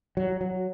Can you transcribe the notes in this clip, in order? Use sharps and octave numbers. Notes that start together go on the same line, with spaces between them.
F#3
F#3